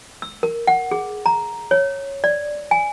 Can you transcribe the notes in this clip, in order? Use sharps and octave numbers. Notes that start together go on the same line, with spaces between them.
E6
A#4
F#5
G#4
A#5
C#5
D5
G#5